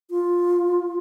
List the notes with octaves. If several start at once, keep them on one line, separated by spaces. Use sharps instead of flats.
F4